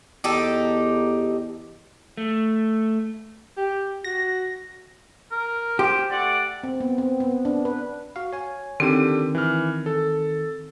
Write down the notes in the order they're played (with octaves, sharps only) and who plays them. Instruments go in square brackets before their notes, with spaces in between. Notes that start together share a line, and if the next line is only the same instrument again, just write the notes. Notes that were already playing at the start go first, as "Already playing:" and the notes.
[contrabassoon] E2 [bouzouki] D#4 G4 A4
[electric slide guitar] A3
[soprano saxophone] G4
[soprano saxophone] F#4 [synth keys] A#6
[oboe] A#4
[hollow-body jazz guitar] G4 [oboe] C5
[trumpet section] A3 F#5 [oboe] D5
[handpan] C4
B3
C4
B3
D4
B4
[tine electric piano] F#4 F5
C#5 G#5
[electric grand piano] D3 G4 D#7 [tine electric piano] D#3 [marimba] C4
[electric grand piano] E3 F6
A4